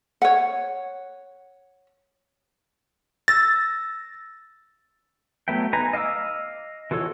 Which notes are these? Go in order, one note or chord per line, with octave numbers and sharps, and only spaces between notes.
C#5 F#5
E6 A6 A#6
F#3 A3 B3 E5 G5
D#4 B4 G#5 A#5
D#5 F5 G#5 D6 E6
E3 F4 F#4 A4 C#5